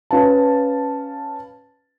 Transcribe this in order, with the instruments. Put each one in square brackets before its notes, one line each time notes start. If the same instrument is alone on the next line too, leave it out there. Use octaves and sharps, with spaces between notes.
[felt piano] C#4 B4 F5 A5